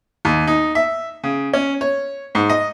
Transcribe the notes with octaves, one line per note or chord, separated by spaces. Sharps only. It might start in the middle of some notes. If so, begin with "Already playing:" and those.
D#2
D#4
E5
C#3
C#4
C#5
G#2
D#5